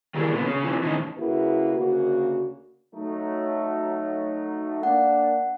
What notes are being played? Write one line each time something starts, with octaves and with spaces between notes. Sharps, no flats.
D#3 F#3 G3 E4 G#4 A#4
A#2 D3 B3
C#3 C#4
C3 E3 F3
A2 D#3 E3 C4 C#4 D#4
C#3 A#3 E4 F#4 G#4 B4
D2 C#3 A#3 F#4
F#3 A3 D#4
A#3 D4 F#5